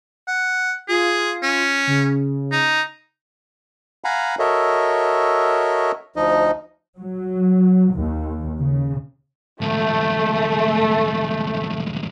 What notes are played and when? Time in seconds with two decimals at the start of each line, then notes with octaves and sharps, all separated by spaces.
0.28 F#5
0.88 F4 G#4
1.43 C#4
1.87 C#3
2.52 D#4
4.04 F5 F#5 G#5 A#5 B5
4.39 F#4 A4 A#4 C#5 D#5 E5
6.16 D2 F3 D#4 D#5
6.96 F#3
7.95 D#2
8.59 C#3
9.61 D2 G#2 A3